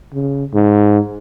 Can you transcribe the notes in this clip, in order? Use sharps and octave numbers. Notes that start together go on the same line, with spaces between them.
C#3
G#2